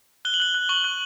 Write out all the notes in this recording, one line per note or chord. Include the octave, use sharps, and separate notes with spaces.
F#6 G7
F#7
F#6 G7
F#6
C#6 F#7
F#6